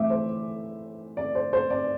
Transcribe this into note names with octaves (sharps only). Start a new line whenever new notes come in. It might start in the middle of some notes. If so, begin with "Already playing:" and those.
Already playing: A2 E3 A3 E5 D6
C5
D5
C5
C5
D5